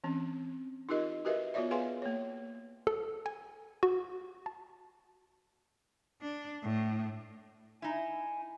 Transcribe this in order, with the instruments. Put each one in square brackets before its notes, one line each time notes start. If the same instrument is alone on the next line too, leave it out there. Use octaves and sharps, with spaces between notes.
[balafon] E3 C4 C#4
D#4 F4 G4 A#4 D#5
F#4 G4 A#4 B4 D#5 E5
B3 F4 F#4 C#5 D5 E5
G#4 B4 F5 G#5 C6
A#3 C#5
[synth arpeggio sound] A4
G#5
F#4
A5
[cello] D4
A2
[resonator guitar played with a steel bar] D#4 E4 [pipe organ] G#5